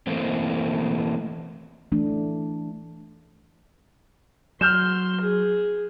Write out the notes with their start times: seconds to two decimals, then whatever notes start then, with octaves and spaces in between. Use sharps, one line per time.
0.07 E3 A3 A#3 C4
1.92 E3 A3 D4
4.61 F#3 C6 F6 G6 E7
5.20 G#4